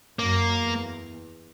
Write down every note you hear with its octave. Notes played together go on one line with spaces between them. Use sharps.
F#2 A#3
E2